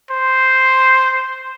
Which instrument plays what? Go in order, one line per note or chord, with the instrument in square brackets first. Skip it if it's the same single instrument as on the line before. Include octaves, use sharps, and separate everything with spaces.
[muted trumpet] C5